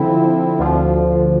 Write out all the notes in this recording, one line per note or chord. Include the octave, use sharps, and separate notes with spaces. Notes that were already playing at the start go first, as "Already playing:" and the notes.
Already playing: D3 F3 C4 E4
D2 D3 F3